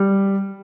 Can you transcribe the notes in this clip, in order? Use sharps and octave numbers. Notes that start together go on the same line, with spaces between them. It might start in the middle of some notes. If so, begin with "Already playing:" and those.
Already playing: G3